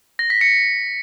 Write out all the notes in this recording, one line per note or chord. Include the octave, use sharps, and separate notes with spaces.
A#6
B6
C#7